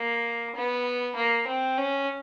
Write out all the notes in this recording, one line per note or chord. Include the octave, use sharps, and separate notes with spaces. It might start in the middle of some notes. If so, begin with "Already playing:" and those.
Already playing: A#3
B3
A#3
C4
C#4